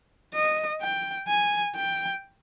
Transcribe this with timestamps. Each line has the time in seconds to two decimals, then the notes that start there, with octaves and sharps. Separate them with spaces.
0.34 D#5
0.81 G5
1.27 G#5
1.75 G5